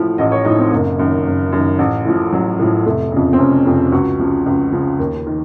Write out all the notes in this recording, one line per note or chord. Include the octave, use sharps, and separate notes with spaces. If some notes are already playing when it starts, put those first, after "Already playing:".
Already playing: A1 A2 F3
A1 D#5
C#5
A2 F3 D#4
C4
F#1 A#3
F#2 D#3
F#1
F#2 D#3
A1
A2 F3
A1 F#3
A2 F3
F1 A3
F2 C#3
C4
F1 C#4
F2 C#3
C#2 F#4
C#3 F3
C#2
C#3 F3
D#2
D#3